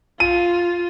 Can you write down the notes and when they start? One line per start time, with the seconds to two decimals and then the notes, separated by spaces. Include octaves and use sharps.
0.20 F4 D#7